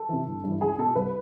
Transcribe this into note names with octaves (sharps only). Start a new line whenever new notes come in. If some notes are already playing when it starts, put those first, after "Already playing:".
Already playing: A4
C3 E3
G1
G2 E3
C#2 G#4
B2 A4
C2 B4